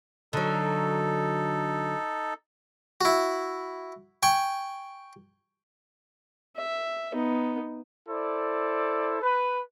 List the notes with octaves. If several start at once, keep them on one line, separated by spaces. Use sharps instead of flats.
D3 F#3 D#4 A4
E4 F#4
G5 G#5 C#6
E5
B3 D#4
E4 A4 C5 D5
B4